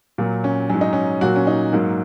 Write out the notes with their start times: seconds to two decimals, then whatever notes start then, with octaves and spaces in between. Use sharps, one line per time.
0.18 A#2 F#3
0.44 C#4
0.69 G#2 F#3 C#4
0.81 D#4
0.93 C#4
1.21 A#2 F#3 F#4
1.36 C#4
1.47 D#4
1.73 G#2 F#3 A#3